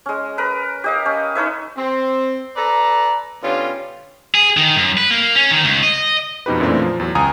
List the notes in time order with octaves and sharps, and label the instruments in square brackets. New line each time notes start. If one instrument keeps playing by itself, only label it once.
[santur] G#3 C#4
A#4 B4
G4 D#5 F5
C#4
D#4 B4 C#5 E5
[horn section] C4
A4 B4 D5 A5 A#5
D3 B3 C#4 D4 F4 G4
[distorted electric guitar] G#4
D#3
F#2
B4
A#3
C#4
D#3
C#2
D#5
[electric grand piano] F2 B2 D#4 G4 B4
F#2 A#2 E3 A3 C4 D4
F3
E2 F#3
C#2 G#5 A#5 D#6